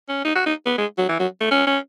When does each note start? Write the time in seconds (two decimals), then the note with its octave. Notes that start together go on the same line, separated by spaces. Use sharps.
0.09 C#4
0.25 D#4
0.35 F#4
0.46 D#4
0.66 B3
0.78 G#3
0.98 F#3
1.09 E3
1.19 F#3
1.41 A3
1.51 C#4
1.67 C#4